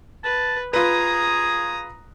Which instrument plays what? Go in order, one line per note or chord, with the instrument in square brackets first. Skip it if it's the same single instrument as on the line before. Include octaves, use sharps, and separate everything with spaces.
[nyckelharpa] B4 [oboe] A5
[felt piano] F4 B4 [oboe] G#4 [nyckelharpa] A#5 D#6